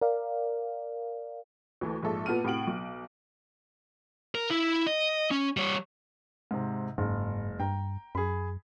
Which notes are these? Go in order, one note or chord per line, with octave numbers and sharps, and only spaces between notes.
A#4 D5 F5
D2 E3 A3
A#1 G#2 A4 E5
A#2 B3 A4 F6 D#7
A2 C3 F#4 D7 F#7
B1
A#4
E4
D#5
C#4
G3 C#5
G#2 C3
F#1 G#2 G#3
G2 G5 A#5
F#2 G#4 B5